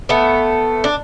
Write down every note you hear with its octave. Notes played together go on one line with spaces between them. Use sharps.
A3 B3
D4